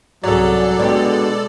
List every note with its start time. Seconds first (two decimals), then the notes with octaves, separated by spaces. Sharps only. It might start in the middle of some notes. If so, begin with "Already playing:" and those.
0.24 C2 G#2 F#3 C#4 A4 D5
0.79 B2 G#3 D4 G4